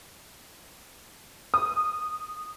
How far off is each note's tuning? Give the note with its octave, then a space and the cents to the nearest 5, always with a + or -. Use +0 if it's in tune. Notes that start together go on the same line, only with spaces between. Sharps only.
D#6 -10